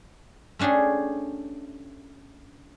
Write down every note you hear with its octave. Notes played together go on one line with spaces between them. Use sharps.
A3 C#4 D4 G4 G#4